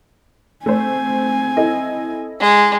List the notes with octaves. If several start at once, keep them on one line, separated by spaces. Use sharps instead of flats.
A3 C4 C5 G#5
E4 A4 D#5
G#3